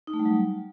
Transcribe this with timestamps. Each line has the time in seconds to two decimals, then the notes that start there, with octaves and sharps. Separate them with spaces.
0.07 D#4
0.13 A3
0.19 G3
0.25 F#3